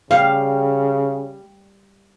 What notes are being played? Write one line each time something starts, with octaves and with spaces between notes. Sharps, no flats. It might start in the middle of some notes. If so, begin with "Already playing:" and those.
C#3 G3 F5